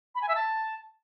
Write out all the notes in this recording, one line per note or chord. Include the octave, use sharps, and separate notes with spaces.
B5
G#5
E5
A5